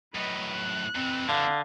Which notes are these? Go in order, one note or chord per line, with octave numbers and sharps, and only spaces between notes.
F#2 A2 B4 D#5
F#6
F2 E3 C4
D3 F5